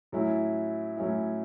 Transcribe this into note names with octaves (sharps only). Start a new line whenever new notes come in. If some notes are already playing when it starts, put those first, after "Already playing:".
A2 F#3 C#4 E4
A2 F#3 C#4 E4